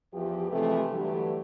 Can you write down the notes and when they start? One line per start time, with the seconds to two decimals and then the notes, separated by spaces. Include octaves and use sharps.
0.13 E2 F3 G4
0.51 C3 E3 F3 G#3 A3
0.90 G2 D3 E3 F#3 A3 G4